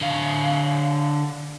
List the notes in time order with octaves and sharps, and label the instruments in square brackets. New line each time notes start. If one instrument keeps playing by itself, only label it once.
[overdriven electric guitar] D3 F5